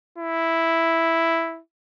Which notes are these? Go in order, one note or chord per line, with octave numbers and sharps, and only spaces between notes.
E4